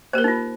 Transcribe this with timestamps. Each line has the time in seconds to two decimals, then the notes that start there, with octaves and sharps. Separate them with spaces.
0.13 A#3 G4 A#4 C5
0.24 D#4
0.28 F4